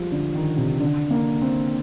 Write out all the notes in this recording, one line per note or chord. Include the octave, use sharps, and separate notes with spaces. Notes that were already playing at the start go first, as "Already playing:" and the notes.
Already playing: F3 G3 G#3
D3
D#3
C3
D3
A#3
C4